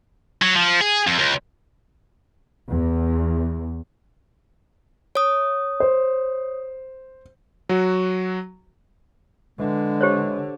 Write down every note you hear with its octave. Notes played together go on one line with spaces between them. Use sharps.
F#3
F3
G#4
F2
C#2
E2
C#5 D#6
C5
F#3 F#4
D3 E3 G#3
G4 C5 C#5